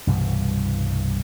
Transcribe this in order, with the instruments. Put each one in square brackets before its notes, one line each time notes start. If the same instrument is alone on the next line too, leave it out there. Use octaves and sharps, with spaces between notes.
[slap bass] C2 G2 B2 E3